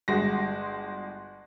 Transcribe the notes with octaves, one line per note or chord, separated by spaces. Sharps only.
G1 G#3 F#4 A#6